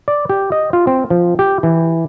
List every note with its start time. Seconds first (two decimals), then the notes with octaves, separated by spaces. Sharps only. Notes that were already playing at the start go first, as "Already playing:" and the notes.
0.08 D5
0.29 G4
0.52 D#5
0.73 F4
0.87 C4
1.10 F3
1.39 G4
1.63 E3